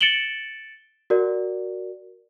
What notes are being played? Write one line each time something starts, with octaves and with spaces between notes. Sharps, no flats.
A6 C#7 D7 E7 F#7 G7
F#4 A#4 D5